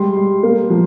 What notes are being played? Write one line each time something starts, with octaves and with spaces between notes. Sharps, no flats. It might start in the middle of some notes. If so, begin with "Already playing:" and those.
Already playing: G3 G#3 C6
G3
A#3
F3